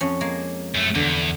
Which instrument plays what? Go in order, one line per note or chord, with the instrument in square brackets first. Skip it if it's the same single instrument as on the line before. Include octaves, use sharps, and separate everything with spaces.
[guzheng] F2 C#4
G#3 A#3
[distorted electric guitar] F#2 A3
[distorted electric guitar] E2 [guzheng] D3